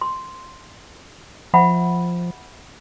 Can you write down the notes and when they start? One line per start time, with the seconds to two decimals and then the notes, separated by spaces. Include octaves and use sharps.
0.01 C6
1.54 F3 E5 F#5 B5